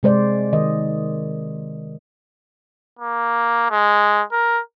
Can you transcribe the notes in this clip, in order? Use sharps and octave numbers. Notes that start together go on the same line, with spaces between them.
C3 G#3 C5 D5
D#3 D#5
A#3
G#3
A#4